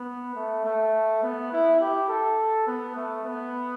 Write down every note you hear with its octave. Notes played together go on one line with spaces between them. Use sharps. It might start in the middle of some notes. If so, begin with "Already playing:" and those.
Already playing: B3
A3
A3
B3
E4
G4
A4
B3
A3
B3